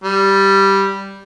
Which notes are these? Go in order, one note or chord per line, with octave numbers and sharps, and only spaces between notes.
G3